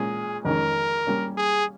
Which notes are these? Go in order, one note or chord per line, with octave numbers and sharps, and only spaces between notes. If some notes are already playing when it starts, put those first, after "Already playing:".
Already playing: A#2 G#3 C#4 G#4
F2 D#3 G#3 C#4 A#4
G3 A#3 C#4
G#4